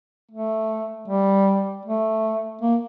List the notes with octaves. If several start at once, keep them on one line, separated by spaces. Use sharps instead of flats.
A3
G3
A3
A#3